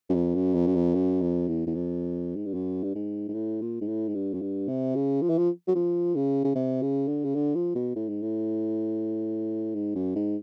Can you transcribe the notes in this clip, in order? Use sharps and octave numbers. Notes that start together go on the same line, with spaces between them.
F#2
F2
F#2
F2
F#2
F2
F#2
F2
E2
E2
F2
G#2
G2
F#2
G2
G#2
G#2
A2
A#2
G#2
A2
G#2
G2
F#2
G2
C3
C#3
F3
E3
F3
F#3
F3
C#3
C#3
C3
C#3
D3
C#3
D3
F3
B2
A2
G#2
A2
G#2
F#2
G#2